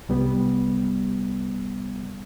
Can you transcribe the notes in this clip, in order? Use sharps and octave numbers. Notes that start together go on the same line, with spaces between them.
C2 G3 B3